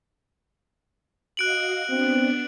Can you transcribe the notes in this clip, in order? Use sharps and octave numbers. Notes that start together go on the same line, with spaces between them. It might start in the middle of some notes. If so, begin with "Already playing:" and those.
F#4 D#5 F5 F#6 D7 F#7
B3 C4 D4